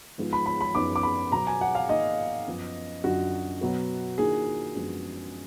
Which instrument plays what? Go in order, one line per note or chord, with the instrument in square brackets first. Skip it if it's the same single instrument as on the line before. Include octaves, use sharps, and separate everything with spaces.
[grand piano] G#2 F3 G#3 B3 F4
[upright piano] B5
B5
B5
[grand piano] F#2 F3 B3 D#4 [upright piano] D6
[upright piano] D6
B5
[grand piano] B2 F#3 B3 [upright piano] A#5
[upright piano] G#5
F#5
F5
[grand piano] D#3 A#3 D#4 [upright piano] D#5
[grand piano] F#2 F3 B3
[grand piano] F#2 D3 F#3 D4 F4 [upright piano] F#4
[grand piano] B2 F#3 B3
[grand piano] D#3 A#3 D4 F4 [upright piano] G#4
[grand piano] F#2 F3 G#3 B3 D4